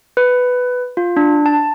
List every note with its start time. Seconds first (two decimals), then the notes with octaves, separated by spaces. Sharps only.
0.17 B4
0.97 F4
1.17 D4
1.46 A5